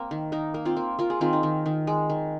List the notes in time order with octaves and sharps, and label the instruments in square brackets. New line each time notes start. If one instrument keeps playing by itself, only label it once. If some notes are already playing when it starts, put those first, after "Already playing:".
Already playing: [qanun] A#3 C4
D#3
A#3 D#4
A#3
C4 F4
A#3
A#3 F4
G#4
D#3 C4 F4
D#4
D#3
D#3
G#3
D#3